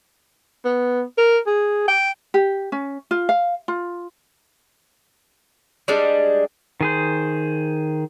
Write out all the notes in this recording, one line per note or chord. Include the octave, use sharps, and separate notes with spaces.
B3
A#4
G#4
G5
G4
C#4
F4
F5
F4
G3 G#3 D4
D#3 G#4 C5